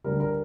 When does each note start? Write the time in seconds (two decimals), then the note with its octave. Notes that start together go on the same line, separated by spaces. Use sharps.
0.04 D2 D3 G3 A#4
0.20 A#4